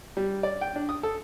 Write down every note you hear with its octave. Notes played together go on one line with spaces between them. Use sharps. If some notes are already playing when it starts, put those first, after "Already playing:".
G3
D5
G5
D4
D#6
A4